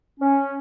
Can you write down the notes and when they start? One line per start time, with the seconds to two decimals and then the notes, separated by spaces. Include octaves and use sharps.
0.20 C#4